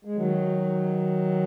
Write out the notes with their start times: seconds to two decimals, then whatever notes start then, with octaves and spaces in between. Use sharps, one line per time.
0.05 G#3
0.16 D#3 F#3